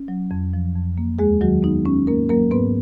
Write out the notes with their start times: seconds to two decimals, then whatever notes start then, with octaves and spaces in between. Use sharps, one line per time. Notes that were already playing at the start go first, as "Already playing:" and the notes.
Already playing: C#4
0.08 F#3
0.31 F2
0.53 F3
0.75 F2
0.98 A#3
1.19 D#2 G#3 G#4
1.41 D#3 F#3 F#4
1.63 B3 D#4
1.85 G#3 C#4
2.07 G#2 A#3 A#4
2.29 F#3 A#3 A#4
2.51 G#2 B3 B4